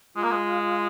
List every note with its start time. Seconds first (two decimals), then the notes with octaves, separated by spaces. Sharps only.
0.16 G#3 F4
0.24 A#3
0.32 G#3